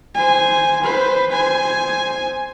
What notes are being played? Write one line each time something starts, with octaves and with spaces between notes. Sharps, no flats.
C5 G#5
B4 C5
C5 G#5